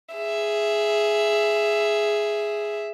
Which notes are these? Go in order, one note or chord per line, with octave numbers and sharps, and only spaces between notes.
G#4 E5